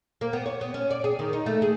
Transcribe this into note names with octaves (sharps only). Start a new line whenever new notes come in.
A#3
B3
C#5
B3
C#4
D5
G#4
D#3
D#4
A3
G#4